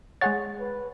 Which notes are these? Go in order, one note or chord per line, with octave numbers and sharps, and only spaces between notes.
G#3 G#4 C#5 F#5 A6
B4